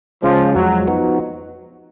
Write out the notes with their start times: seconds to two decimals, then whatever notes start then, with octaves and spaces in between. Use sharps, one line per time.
0.23 C#3 F3 G#3 C#4
0.55 F2 F3 F#3 G#3
0.87 F3 B3 D#4 F#4